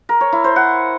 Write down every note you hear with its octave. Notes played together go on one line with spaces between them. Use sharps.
A#4
C#5
E4
C5
F#5